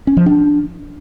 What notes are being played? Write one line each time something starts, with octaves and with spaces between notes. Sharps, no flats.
C#4
F3
D4